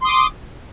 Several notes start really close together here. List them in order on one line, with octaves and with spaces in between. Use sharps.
C6 D#6 D6